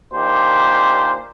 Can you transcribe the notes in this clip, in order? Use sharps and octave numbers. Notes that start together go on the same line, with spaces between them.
A#2 D#3 D4 G4 C5